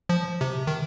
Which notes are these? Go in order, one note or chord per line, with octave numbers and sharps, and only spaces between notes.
F3
C3
D#3